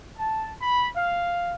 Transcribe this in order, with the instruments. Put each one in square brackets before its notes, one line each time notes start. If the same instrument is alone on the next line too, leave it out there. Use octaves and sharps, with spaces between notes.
[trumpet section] A5
B5
F5